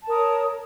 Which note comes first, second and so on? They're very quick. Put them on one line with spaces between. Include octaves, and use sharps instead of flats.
A5 A#4 D#6 C#5